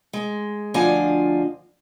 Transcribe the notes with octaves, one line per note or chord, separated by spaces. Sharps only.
G#3
D2 F3 D4 F4 D#5 G#5